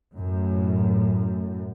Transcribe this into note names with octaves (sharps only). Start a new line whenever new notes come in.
F#2 A2